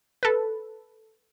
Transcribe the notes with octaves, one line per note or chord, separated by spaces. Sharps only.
A4 B4